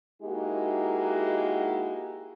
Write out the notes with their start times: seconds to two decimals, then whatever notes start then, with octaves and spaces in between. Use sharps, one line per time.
0.22 G#3 A#3 D#4 E4 F#4 G4